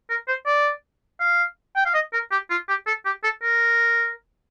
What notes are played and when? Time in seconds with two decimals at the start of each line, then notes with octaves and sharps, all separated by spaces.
0.10 A#4
0.28 C5
0.47 D5
1.20 F5
1.77 G5
1.86 F5
1.94 D#5
2.13 A#4
2.32 G4
2.50 F4
2.69 G4
2.87 A4
3.06 G4
3.24 A4
3.43 A#4